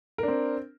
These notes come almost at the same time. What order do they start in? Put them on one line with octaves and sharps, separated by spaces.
A#4 D4 C4